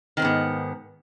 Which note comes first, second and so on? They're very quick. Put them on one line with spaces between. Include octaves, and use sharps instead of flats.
D#3 C4 G#2 B3